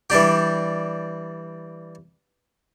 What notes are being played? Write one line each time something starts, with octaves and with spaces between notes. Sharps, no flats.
E3 G3 D4 G4